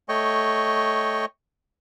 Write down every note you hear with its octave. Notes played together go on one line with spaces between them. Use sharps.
A3 C#5 D#5 G5 C#6